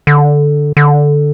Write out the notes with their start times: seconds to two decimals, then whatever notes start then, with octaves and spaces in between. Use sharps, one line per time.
0.07 D3
0.77 D3